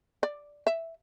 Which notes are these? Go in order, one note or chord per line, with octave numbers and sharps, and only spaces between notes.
D5
E5